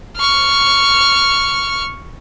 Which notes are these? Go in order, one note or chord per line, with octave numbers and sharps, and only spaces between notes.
C#6 F6